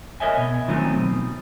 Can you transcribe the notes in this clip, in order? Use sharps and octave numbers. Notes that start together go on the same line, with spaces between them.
A#4 C#5 D#5 E5 G#5
B2
D#3 F3 F#3 A3 C4 C#4
B2